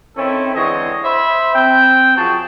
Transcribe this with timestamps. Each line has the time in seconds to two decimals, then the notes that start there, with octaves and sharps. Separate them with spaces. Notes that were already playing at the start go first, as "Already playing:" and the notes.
0.17 D#3 C4 C#4 E4 A4
0.55 D3 E3 G#3 C4 C#5 D#5
1.04 C5 E5 B5
1.55 C4 G5
2.17 F#2 F3 F#4 G#4 A5